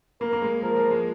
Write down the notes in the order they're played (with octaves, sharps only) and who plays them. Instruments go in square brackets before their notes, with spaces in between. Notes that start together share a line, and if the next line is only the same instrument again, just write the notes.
[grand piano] A#3 [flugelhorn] A#4
[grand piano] A#3
G#3
[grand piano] F3 [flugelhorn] A#4
[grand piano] F3
G#3